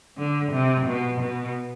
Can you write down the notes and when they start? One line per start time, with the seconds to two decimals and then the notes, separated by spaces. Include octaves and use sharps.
0.18 D3
0.51 C3
0.86 B2
1.20 B2